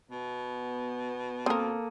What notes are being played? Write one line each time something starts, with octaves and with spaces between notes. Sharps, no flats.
B2 B3
A#3 C4 A4 A#4 D#6